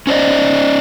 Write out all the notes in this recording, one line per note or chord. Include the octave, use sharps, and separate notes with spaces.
C#4 C5 D5 D#5